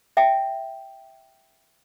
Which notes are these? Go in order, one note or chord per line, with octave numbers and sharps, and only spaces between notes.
E5 G5